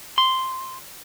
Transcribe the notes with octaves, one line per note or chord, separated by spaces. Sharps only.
C6